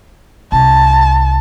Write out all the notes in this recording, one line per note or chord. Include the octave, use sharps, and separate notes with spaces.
C2 A5